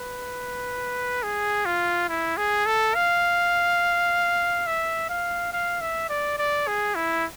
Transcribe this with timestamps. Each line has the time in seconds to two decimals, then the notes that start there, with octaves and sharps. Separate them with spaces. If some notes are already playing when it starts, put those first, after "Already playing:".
Already playing: B4
1.23 G#4
1.66 F4
2.09 E4
2.37 G#4
2.66 A4
2.95 F5
4.67 E5
5.09 F5
5.53 F5
5.81 E5
6.09 D5
6.39 D5
6.67 G#4
6.95 E4